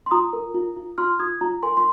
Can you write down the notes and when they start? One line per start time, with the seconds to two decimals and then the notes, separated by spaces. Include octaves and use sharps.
0.06 C6
0.11 F4 A#5 D#6
0.33 A#4
0.54 F4
0.76 F4
0.98 F4 C6 F6
1.20 F4 D#6 G#6
1.41 F4 A#5
1.63 A#4 G#5 C6
1.77 C6